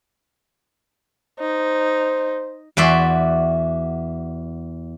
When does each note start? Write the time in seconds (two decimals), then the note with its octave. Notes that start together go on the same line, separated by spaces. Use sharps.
1.39 D#4 C5
2.77 E2 F#4 D5 E5 C6